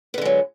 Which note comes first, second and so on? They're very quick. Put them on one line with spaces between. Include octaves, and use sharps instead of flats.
B3 D3 G#3 F#3